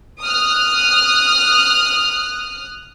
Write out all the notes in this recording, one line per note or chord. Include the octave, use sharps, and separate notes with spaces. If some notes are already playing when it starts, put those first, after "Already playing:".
D#6 F6 F#6